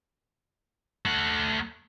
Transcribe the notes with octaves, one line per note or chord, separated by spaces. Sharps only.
A3 F#5